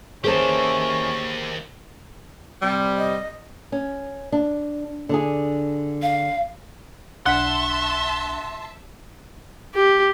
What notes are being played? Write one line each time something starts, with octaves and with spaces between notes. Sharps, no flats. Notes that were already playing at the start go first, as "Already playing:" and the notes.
E3 A#3 C#4 G4 G#4 C5 C#5 A5
C3 G3
D#5
C#4
D4
D3 D4 G#4
F5
B1 D4 E5 F#5 A5 C6 B6
G4